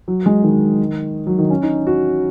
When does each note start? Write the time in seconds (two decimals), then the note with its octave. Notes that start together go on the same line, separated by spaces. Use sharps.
0.08 F#3
0.26 G#3
0.43 D#3
1.27 F#3
1.39 D#3
1.50 C#4
1.63 D#4
1.87 F#4